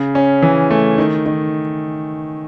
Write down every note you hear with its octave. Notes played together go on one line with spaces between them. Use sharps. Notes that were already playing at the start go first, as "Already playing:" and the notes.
Already playing: C#3
C#4
E3
A3
D#3
D#3